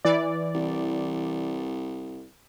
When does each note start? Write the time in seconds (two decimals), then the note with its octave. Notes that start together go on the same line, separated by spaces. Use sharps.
0.05 E3 D5
0.54 C2